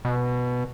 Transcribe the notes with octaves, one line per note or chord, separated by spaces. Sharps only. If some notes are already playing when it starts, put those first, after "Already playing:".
B2